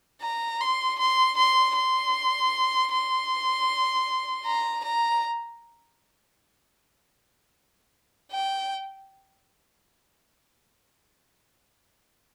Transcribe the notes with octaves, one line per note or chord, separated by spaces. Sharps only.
A#5
C6
C6
C6
C6
C6
A#5
A#5
G5